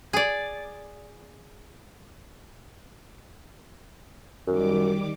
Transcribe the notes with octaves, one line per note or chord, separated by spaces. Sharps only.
G#4 D5
F#2 D#3 G3 D6